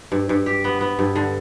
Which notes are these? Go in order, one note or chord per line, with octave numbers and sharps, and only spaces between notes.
G2
G2
G4
B3
B3
G2
D3